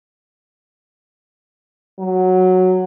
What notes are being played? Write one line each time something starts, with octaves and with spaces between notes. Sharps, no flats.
F#3